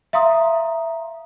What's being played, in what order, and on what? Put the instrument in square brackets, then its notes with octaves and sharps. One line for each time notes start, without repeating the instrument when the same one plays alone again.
[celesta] E5 F5 A#5 C6 D#6